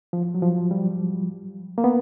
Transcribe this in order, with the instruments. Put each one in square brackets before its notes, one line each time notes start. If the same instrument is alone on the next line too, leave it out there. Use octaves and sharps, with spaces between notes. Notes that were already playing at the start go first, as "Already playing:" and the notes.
[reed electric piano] F3
F#3
F3
G3
A#3
B3